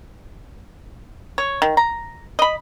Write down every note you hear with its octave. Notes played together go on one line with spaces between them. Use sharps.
C#5
D#3
A#5
D#5 B5